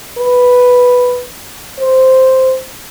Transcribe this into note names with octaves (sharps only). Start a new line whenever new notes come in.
B4
C5